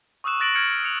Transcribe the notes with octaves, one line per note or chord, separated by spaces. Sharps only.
C#6 D#6 E6 F#6 E7
C#6 F#6 A6 A#6 D7 F#7
F6 G#6 C#7 D7
C#7 F7